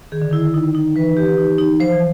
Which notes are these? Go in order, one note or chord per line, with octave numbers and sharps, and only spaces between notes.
D#3 G#4
D3
D#3 E4
D#4
D#4
E3 B4
G4
D#4
D#4
F3 C5
E3